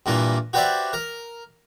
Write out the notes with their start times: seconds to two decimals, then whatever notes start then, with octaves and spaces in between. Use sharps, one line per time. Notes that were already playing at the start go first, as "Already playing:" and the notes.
0.06 G2 A#2 E3 A#3
0.53 F#4 G4 B4 C5 D5 E5
0.93 A#4